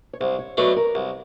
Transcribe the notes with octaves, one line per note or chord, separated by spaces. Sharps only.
C#5
C2 C5
C#5
B2 F#3 A3 D4 B4
A#4
C2